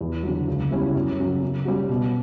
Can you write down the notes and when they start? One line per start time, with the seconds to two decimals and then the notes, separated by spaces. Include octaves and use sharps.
0.01 E2
0.23 D3 F#3
0.48 C#2
0.71 C#3 G3 C#4 E4
0.95 F#2
1.19 C#3 F#3
1.43 C#3
1.65 G3 C#4 F#4
1.89 B2